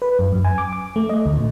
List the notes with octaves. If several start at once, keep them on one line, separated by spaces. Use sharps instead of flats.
B4
F#2
F#2
G#5
D6
D6
A3
D#5
D2
A#2